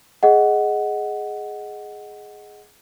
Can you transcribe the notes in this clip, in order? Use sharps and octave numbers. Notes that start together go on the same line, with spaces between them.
G#4 D#5 F#5